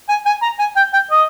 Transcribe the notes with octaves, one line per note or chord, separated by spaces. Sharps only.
G#5
G#5
A#5
G#5
G5
G5
D#5